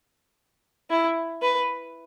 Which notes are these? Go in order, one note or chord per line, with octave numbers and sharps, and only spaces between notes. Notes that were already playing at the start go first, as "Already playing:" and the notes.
E4
B4